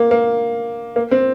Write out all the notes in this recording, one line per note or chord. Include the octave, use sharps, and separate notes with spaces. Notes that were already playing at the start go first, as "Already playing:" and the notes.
Already playing: A#3
A#3
A#3
C4